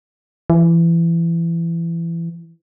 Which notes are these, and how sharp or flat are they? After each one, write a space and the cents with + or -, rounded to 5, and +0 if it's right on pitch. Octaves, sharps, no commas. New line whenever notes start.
E3 +25